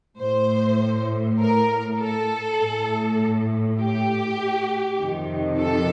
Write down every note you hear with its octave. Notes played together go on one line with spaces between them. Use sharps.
A2 C5
A#4
A4
A2
G4
F2 C3 D#3
A4